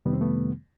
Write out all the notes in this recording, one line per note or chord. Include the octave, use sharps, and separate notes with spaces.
F2 C3 D#3 G3 B3
C4
A3 B3